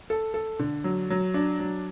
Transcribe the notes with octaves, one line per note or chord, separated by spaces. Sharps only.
A4
A4
D3
F#3
F#3
D4
F#3